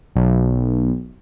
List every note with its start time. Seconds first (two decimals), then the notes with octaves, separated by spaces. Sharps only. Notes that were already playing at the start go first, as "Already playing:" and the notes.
0.16 B1